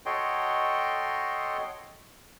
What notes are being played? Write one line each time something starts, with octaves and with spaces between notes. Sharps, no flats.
F#4 A4 C#5 D#5 G5 C6